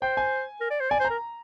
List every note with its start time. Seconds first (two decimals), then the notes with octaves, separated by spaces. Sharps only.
0.02 C5 G5
0.17 G#5
0.61 A#4
0.71 D5
0.80 C5
0.90 D5 G#5
1.00 C5
1.05 A#5
1.10 A#4